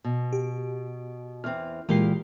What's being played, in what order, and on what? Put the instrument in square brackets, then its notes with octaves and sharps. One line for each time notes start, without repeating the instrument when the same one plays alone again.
[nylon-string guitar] B2
[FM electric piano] G4
[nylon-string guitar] E2 C4 [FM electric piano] F6
[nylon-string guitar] A#2 G4 A#4 [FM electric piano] E3 G#3 C7